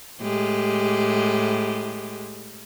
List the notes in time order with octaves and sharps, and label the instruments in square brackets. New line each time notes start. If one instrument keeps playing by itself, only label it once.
[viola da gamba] A2 G#3 G4